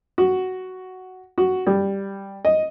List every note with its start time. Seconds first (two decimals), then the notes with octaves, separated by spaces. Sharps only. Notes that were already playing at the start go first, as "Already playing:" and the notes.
0.18 F#4
1.38 F#4
1.67 G3
2.45 D#5